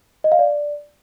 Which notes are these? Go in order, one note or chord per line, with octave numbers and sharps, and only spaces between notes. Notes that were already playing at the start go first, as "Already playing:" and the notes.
D#5
F5
D5